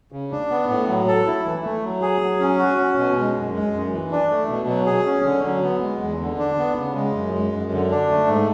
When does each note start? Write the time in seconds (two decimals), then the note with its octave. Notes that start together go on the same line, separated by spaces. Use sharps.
0.12 C#3
0.31 D4
0.50 B3
0.69 A2
0.88 F#3
1.08 A4
1.26 E4
1.45 E3
1.64 A3
1.84 F#3
2.02 G#4
2.21 F#3
2.40 C#4
2.59 F#4
2.78 C#4
2.97 B2
3.16 G#3
3.35 F#2
3.54 G#3
3.73 F#2
3.92 E3
4.11 D4
4.30 A3
4.49 B2
4.68 F#3
4.86 G#4
5.05 C#4
5.24 D3
5.44 F#3
5.62 B3
5.82 G#3
6.00 E2
6.20 D3
6.39 D4
6.58 B3
6.77 C#3
6.95 G#3
7.15 F#2
7.34 G#3
7.52 F#2
7.72 D3
7.91 D4
8.10 A3
8.28 G#2